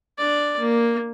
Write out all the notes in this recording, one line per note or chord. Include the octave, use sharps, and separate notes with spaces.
D4 D5
A#3